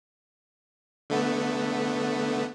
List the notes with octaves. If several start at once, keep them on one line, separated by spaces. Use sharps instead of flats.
D3 A3 B3